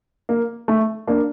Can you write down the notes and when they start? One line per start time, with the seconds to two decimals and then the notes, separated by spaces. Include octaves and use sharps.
0.29 A#3
0.68 A3
1.07 A#3 D4